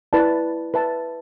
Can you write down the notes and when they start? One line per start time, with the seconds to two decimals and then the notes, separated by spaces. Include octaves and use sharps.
0.13 E4 B4 D5 A5
0.74 B4 E5 A5